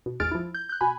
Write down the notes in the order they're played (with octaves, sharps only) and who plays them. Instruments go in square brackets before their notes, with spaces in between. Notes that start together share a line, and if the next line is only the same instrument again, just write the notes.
[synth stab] B2
G#1 E2 G#3 F6 A6 D7
F3 E4
G6
F#6 G6
B2 G#5 B5